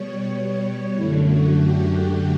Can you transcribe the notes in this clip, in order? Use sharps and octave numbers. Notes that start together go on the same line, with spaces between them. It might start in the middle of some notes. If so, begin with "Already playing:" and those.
Already playing: B2 G3 C#5
F#2 D3 A3 E4
F#4
G4